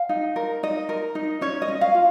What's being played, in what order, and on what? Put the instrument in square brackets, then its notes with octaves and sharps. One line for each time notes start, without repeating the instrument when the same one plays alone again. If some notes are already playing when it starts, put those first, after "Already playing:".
Already playing: [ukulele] F5
D#4
A#4
D#4 D#5
A#4
D#4
C#4 C#5
D#5
C#4
F5
F4